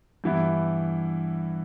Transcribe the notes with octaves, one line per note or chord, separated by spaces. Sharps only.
G2 E3 B3 E4